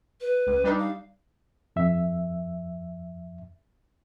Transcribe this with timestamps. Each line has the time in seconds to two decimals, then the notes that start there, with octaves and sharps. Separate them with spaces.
0.21 B4
0.47 C#2
0.64 G3 D4 D#4
0.79 F5
1.76 F2 E5